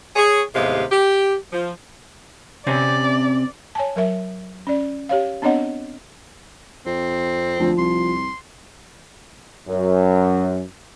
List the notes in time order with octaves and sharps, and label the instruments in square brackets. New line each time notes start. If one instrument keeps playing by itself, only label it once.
[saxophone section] G#4 C#5
D#2 A2 C3 G#3 B3 F5
G4
F3
[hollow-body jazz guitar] C3 C4 C#4 [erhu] D5
[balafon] C#5 G#5 A5
F#3 A#4 E5
C#4 D5
G4 C#5 F5
B3 C4 D4 C#5 D#5 F#5
[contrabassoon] F2 [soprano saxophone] C4
[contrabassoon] D2 [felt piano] F3
[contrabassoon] C2 [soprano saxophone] C6
[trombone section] F#2